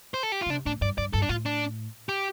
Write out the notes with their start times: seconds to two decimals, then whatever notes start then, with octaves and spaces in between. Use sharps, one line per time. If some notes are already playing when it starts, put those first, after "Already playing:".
0.14 C5
0.23 A4
0.32 G4
0.41 F4
0.46 D3
0.50 C3 D4
0.66 A2 D4
0.81 G2 D5
0.98 G2 D5
1.13 G2 A4
1.22 D4
1.29 A2 F4
1.46 D4
2.09 G4